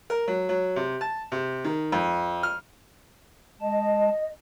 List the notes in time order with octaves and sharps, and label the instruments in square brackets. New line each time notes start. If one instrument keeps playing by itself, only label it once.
[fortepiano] A#4
F#3
F#3
C3
A5
C3
D#3
F2
F6
[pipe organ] G#3 A5 [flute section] D#5